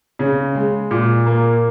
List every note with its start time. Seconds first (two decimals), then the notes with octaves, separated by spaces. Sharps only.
0.19 C#3
0.55 G#3
0.91 A#2
1.26 A#3